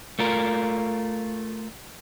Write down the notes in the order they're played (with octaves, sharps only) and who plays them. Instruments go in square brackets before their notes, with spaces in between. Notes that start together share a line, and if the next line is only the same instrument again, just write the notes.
[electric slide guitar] A3 F4 A#4